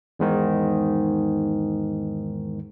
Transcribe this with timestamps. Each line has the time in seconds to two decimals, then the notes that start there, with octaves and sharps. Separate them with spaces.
0.19 E2 G#2 D#3